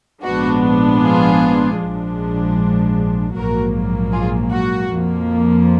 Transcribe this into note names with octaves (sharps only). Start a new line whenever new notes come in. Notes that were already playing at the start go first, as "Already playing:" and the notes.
A#1 G#2 F3 B3 D4 F#4
F4 G#4
A#1 G#2 F3 G#3 D4
A#1 G#2 F#3 A#3 F#4 A#4
F4 G#4
F#4
F2 F3 A#3